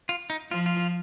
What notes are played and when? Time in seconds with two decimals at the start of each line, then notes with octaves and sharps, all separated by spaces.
0.09 F4
0.30 D#4
0.51 F3 F4
0.66 F4